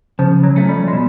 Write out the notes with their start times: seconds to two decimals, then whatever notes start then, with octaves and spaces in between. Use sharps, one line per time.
0.19 C#3 F3
0.43 F#3
0.56 F3 A3 C#4
0.69 G3
0.88 G#3
0.93 B2 G3